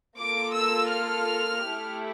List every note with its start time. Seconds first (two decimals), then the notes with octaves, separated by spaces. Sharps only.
0.17 A#3 F4 A4 D6
0.53 E6
0.91 F6
1.65 A3 E4 G4